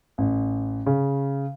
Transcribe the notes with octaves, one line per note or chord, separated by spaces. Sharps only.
A1
C#3